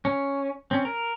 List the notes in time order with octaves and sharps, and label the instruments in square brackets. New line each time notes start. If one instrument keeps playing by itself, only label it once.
[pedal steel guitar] C#4
C4 C#4
A#4